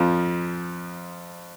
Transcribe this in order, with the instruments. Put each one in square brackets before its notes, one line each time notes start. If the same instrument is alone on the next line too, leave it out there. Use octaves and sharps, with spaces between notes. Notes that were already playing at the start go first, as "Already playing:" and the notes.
Already playing: [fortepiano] F2 F3